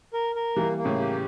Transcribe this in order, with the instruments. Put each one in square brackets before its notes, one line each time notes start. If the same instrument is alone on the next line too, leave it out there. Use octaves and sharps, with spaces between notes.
[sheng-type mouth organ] A#4
A#4
[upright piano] E3 G3 [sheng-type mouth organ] A#3
[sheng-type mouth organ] A#3
[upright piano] A2 C#3
[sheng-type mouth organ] G4